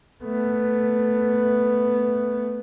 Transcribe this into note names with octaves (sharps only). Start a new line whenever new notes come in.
A3 B3